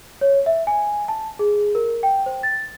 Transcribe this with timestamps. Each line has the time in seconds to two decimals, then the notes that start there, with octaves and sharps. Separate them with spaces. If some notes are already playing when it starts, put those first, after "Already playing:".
0.21 C#5
0.46 E5
0.67 G#5
1.08 A5
1.39 G#4
1.75 A#4
2.03 G5
2.26 C5
2.43 A6